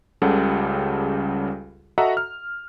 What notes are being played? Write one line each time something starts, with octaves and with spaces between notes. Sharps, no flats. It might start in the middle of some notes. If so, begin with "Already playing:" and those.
C#2 C#3 G3 G4 A4 F#5
F#4 A4 D#5 E5 F#5 A#5
F6